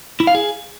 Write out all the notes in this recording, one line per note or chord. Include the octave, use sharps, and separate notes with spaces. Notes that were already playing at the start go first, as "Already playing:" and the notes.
E4
F5
G#4